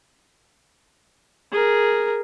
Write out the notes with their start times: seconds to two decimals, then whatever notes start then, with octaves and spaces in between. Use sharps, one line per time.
1.52 G#4 A#4